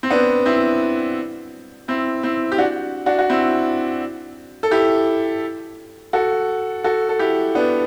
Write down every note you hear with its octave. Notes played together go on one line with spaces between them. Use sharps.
C4
B3 D4
C4 E4
C4 E4
C4 E4
G4
D4 F#4
D4 F#4
F#4
C4 E4
A4
E4 G4
F#4 A4
F#4 A4
A4
E4 G4
B3 D4